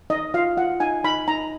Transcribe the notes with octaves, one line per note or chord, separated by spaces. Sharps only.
D#4 D#5
F4 F5
F4 F#5
D#4 G#5
D#4 B5
D#4 A#5